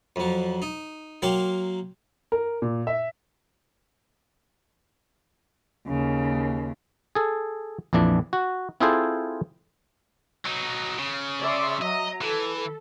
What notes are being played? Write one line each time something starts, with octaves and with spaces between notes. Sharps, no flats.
F2 F#3
D#4
F#3 A#3 F5 G5 C6
A#4
A#2
E5
D#2 C#3
G#4 A4
A#1 F2 E3 D4
F#4
C4 E4 F4 G#4 A4 C5
F#3 D#4
C#3
D5 E5 C6
F#3 D#5 A#5
E3 A4